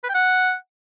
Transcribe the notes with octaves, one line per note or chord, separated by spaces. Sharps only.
B4
G5
F#5